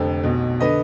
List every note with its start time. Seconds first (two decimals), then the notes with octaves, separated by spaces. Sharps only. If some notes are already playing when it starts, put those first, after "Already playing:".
Already playing: F1 F2 D3
0.24 B1 B2
0.60 D3 B4 D#5